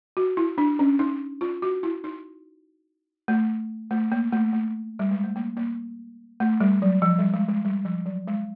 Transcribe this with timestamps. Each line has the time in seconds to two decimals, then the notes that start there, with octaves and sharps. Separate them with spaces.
0.17 F#4
0.37 E4
0.58 D4
0.79 C#4
0.99 D#4
1.41 F4
1.62 F#4
1.83 E4
2.04 D#4
3.28 A3
3.91 A3
4.12 A#3
4.32 A3
4.53 A3
4.99 G3
5.11 G#3
5.24 A3
5.36 A#3
5.57 A#3
6.40 A3
6.60 G3
6.82 F#3
7.02 F3
7.18 G3
7.34 G#3
7.49 G#3
7.64 G3
7.85 F3
8.06 F#3
8.28 G#3